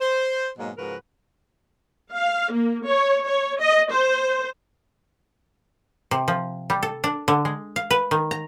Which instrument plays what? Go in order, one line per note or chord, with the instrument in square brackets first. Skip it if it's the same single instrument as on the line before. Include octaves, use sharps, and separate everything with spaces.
[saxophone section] C5
G#2 B2 F#3 G#3 A#3
G#2 C#3 F3 F#4 A#4 B4
[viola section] F5
A#3
C#5
C#5
D#5
C5
[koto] C3
F3
G3
A4
D4
D3
G#3
F5
B4
D#3
A#5